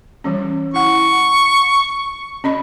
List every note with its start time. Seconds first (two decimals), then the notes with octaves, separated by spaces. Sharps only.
0.24 E3 G3 C#4
0.74 E4 F#5 C#6
2.44 C#4 D#5 B5